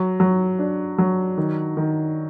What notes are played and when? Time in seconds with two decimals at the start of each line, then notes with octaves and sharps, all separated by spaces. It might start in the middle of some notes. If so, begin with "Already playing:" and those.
Already playing: F#3
0.20 F#3
0.59 D4
0.98 F#3
1.38 D#3
1.77 D#3